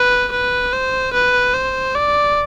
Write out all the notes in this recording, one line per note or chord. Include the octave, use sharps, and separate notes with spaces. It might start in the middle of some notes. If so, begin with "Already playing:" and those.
Already playing: B4
B4
C5
B4
C5
D5